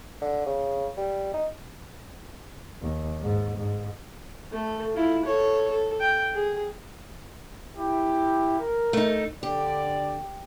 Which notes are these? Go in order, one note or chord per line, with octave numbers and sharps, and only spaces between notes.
D3
C#3
G3
D#4
D#2
G#2
G#2
A3 A4
E4 F4
A4 C#5
A4
G5
G#4
E4 G4
A#4
A3 D#4
D3 G4 D5